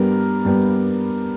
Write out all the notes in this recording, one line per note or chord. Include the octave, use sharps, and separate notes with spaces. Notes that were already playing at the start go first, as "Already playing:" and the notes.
Already playing: G2 G3 B3 G4 A#4
G2 G3 B3